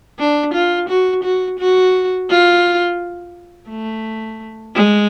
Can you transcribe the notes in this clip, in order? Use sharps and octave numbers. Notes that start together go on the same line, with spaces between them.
D4
F4
F#4
F#4
F#4
F4
A3
G#3